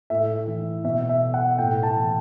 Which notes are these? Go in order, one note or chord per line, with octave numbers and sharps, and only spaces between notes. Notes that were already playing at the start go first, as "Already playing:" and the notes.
A2 E5
E3
B2 E5
E5
F#5
A2 G5
A5
E3